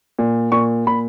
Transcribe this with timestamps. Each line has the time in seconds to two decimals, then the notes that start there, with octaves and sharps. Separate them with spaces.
0.19 A#2
0.52 A#2 C#6
0.87 A#2 B5